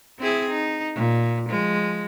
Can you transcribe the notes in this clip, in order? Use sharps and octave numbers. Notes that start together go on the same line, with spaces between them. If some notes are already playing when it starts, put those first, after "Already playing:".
C4 E4 G#4
D#4
A#2
F3 G#3